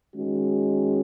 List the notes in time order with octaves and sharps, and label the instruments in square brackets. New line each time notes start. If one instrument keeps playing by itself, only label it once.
[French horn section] D#3 G#3 C#4 F#4